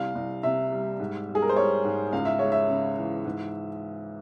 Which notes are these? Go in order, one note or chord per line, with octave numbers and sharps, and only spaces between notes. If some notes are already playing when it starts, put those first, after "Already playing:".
Already playing: C2 C3 G3 F5
C2
C3 E5
G3
G#2
G3
G#4
A#4
C5
G3 C#5
G#2
C#2 F5
E5
G#3 C#5
E5
C#3
E3
G#2